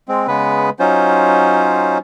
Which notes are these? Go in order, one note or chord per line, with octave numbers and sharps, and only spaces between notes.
G#3 C4
C#3 G#3 B3 B4
F#3 C#4 D#4 F4 C5